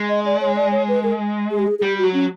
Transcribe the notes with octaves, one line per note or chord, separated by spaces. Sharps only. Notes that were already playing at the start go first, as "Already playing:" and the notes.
Already playing: G#3
D#5
D5
C#5
D5
C#5
B4
A#4
G#4
G4
G#4
G#4
G3 G4
F#4
F#3
C#4